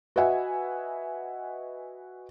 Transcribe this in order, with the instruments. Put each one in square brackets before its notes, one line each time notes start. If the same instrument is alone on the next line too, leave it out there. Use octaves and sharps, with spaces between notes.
[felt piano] F#4 B4 D#5 E5 F#5 G#5